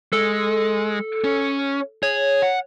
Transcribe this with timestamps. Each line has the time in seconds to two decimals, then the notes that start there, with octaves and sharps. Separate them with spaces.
0.13 G#3 A4
1.24 C#4
2.03 G#4 C#5
2.42 F#5